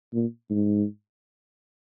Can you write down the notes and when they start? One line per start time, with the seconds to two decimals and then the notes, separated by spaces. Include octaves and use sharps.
0.13 A#2
0.50 G#2